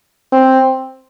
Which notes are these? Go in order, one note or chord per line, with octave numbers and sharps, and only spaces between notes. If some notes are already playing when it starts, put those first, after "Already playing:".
C4